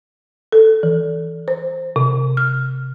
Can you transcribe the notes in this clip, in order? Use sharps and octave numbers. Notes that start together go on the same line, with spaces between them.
A4
E3
C5
C3
F6